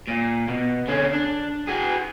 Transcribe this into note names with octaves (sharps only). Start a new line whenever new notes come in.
A#2
B2
D3 C#4
D4
F#4 G#4